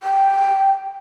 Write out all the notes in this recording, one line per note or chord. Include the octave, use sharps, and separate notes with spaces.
G5